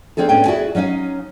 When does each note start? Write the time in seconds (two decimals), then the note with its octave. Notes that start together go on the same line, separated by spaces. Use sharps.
0.17 A#3 C4 D4 G#4 A4
0.29 A2 B3 C#4 D4 G5
0.46 E4 F#4 G#4 D5 G#5
0.75 F#3 C#4 D#4 D#5 F5